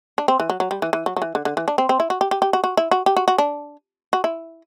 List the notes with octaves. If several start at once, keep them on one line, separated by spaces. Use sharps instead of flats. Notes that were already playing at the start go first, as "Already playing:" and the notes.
D4
C4
E3
F#3
F#3
G3
E3
E3
F#3
F#3
E3
D3
D3
E3
D4
C4
C4
E4
F#4
G4
G4
G4
F#4
F#4
E4
F#4
G4
F#4
F#4
D4
F#4
E4